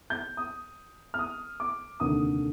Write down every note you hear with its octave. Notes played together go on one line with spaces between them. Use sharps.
G6
D#6
F6
D#6
D6
F1 D#2 D3 D#6